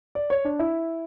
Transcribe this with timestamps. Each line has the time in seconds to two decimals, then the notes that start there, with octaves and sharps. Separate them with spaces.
0.15 D5
0.30 C#5
0.45 D4
0.59 E4